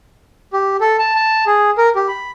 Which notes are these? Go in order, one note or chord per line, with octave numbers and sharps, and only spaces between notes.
G4
A4
A5
A5
G#4
A#4
G4
B5